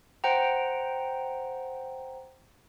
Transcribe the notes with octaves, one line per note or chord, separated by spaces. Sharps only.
C5 F#5 G5 A#5